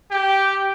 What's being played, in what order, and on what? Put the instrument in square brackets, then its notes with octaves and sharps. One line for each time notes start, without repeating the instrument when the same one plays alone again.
[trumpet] G4